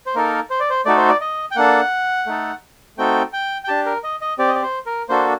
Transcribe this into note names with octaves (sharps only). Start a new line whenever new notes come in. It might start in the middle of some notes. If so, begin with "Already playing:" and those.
C5
A#3 D#4 A4 A#4
C5
D5
C5
A3 D#4 F#4 A4 D5
C5
D5
D#5
G5
A#3 D4 A4 F#5
A3 D#4 A4
A3 C4 D#4 F#4 A4 G5
G5
G5
D4 G4 A5
A#4
D#5
D#5
C4 G4 D5
D#5
D5
C5
A#4
A#3 D4 F#4 A4 C5